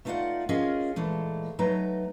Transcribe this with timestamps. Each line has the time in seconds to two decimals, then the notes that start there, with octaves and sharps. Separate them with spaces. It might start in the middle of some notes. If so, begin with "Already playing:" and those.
0.05 A3 B3 D#4 F4 D5 F#5
0.49 C#4 F4 G#4 A#4 D#5
0.96 A#2 E3 G#3 A3
1.59 F#3 A3 D#4 B4 A#5